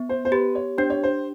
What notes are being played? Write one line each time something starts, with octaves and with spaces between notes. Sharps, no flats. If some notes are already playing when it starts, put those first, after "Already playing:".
Already playing: B3
C5
C5
G4 B4
C#5
D4 C5
C#5
C5